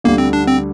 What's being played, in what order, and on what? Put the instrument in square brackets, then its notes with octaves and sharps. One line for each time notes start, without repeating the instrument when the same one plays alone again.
[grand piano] D2 D3 G3 [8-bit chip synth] A#3
[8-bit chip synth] C4
D4
C4